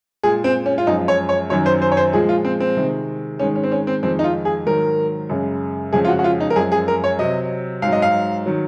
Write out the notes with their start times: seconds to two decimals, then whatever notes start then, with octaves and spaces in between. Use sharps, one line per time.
0.23 A#2 G#3 G#4
0.44 C4
0.66 C#4
0.78 F4
0.87 F#2 F3 G#3 D#4
1.08 C#5
1.29 C#5
1.49 F#2 D#3 F#3 C#5
1.66 C5
1.82 C5
1.92 C#5
1.97 C5
2.13 A#2 F3 G#3 G#4
2.29 F4
2.45 C4
2.60 C4
2.77 C3 D#3 G#3
3.39 G#2 D#3 G#3 C#4
3.56 C#4
3.63 C4
3.72 C#4
3.87 C4
4.03 F2 D#3 G#3 C4
4.19 D#4
4.24 F4
4.45 G#4
4.66 G#2 D#3 F#3 A#4
5.29 F#2 C#3 G#3
5.93 F2 C#3 G#3 G#4
6.05 F4
6.08 F#4
6.19 F#4
6.24 F4
6.40 D#4
6.50 A#4
6.56 F#2 F3 G#3 G#4
6.72 G#4
6.88 A#4
7.04 C#5
7.19 C3 F#3 D#5
7.82 G#2 F#3 F5
7.93 D#5
8.02 F5
8.46 D#3 F#3